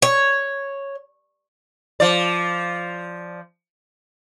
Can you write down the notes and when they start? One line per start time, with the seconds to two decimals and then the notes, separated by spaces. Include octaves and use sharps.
0.02 C#5
2.00 F3 D5